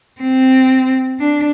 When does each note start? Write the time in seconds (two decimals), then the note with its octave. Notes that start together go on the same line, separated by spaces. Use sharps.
0.21 C4
1.20 D4